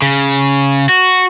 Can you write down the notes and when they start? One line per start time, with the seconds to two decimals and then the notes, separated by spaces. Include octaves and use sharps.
0.02 C#3
0.89 F#4